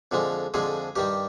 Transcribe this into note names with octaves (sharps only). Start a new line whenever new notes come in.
F2 D3 F3 G#3
F2 D3 F3 G#3 G#4
G2 D#3 G3 G4